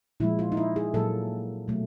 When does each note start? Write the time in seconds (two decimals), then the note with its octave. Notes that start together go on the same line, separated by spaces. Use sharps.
0.20 A#2 F3 G#3 E4
0.39 F4
0.52 D#4
0.57 E4
0.76 G#4
0.94 A#2 F#3 A#3 A4
1.68 B2 F#3 A3